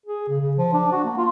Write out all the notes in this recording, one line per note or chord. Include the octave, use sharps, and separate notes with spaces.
G#4
C#3
C#3
F3
D4
F#4
A#3
F4